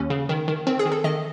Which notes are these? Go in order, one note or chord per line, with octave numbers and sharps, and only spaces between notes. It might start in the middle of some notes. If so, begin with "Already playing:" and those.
Already playing: D#2 C#4
C#3
D#3
D#3
D#3 C4
G#4
D#3
A4
D#3 D#5